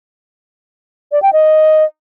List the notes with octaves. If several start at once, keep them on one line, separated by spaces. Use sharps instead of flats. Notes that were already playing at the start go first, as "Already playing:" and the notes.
D5
G5
D#5